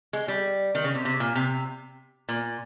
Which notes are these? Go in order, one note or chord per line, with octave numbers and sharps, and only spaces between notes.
G#3
G3
D#3
C#3
C3
C3
A#2
C3
A#2